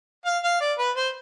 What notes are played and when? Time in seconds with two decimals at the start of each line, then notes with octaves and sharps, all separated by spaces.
0.25 F5
0.43 F5
0.61 D5
0.78 B4
0.96 C5